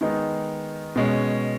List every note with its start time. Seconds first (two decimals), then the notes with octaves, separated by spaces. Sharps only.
0.01 D#3 G#3 B3 D#4
0.96 B2 G#3 C#4